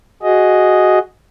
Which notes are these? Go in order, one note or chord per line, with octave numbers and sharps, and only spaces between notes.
F#4 G#4 D#5